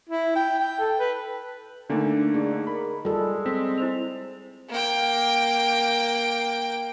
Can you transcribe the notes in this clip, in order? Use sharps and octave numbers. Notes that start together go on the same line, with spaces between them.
E4
G5
G5
A4
B4
D3 A3 A#3 D4 D#4
D#4 G#4 D5
A#4 B5
G3 G#3 F4 A4
C4 B6
E4 C5 F7
A#3 G5